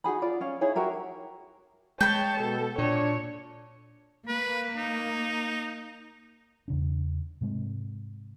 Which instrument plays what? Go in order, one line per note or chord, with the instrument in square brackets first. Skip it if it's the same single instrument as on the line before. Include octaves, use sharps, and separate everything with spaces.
[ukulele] D#4 F#4 G#4 B5
F4 D5
C#4 F5
D#4 E4 G#4 C#5
F#4 G4 A#4 E5
[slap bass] G#3 [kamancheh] C#5 A5 [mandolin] G5 B5
[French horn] B2 [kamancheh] A4
[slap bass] A#2 [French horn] D4 [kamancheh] C#5
[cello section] A#3 [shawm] B4
[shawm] D#4
[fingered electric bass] E2 C#3 D4
G#2 C3 G#3